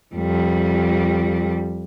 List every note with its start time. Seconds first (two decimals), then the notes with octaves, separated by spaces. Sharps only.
0.15 F2 G3